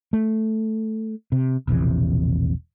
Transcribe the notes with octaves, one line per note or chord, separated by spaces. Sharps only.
A3
C3
E1 A#1 C3 E3